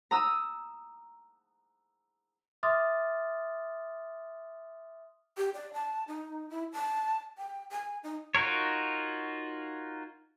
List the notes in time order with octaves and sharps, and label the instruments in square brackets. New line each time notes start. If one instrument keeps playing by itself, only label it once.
[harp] A#5 D#6 E6
[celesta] E5 C6 D6 D#6 F6 A6
[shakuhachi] G4
D5
A5
D#4
E4
A5
G5
G#5
D#4
[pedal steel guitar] D#4 F4 F#4 A#4 C#5